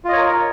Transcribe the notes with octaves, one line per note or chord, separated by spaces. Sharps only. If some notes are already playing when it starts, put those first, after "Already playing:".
F4 A#4 C#5 D#5